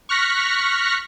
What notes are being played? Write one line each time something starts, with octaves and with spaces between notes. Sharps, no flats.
C#6 F6 F#6 A#6 B6 C#7